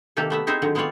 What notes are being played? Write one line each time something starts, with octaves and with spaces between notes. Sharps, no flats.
C3 D#3 A#3 G4 A4
A3 B3 E5
C4 D#4 E4 G#4 C5
D3 D#3 F#3
G#3 B3 C4 F4 C#5 D5